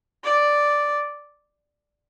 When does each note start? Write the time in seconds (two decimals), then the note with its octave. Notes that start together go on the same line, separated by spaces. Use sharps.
0.24 D5